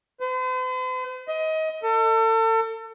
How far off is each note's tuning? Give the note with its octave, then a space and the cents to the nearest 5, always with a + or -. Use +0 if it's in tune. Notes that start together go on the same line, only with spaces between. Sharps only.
C5 -45
D#5 +25
A4 +35